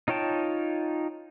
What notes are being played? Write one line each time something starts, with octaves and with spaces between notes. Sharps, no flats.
D#4 F4 C#5 G5 A5